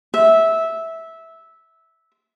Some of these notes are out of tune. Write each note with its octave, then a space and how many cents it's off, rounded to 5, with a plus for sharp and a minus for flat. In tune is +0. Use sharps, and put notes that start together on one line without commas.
E5 -10